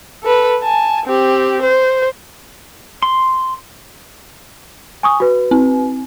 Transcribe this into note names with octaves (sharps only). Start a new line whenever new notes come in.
A4 B4
G#5 A5
C4 G4
C5
C6
G#5 C#6 D#6
F#4 B4
C4